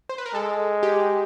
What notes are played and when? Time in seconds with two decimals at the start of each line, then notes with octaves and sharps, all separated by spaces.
0.09 C5
0.18 B4
0.26 A#4
0.34 G#3 A4
0.83 G4